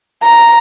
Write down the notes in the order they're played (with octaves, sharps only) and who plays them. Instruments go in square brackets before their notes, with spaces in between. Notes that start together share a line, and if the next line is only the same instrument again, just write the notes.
[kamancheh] A#5